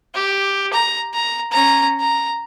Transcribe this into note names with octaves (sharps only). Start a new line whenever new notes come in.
G4
A#5
A#5
C#4 A#5
A#5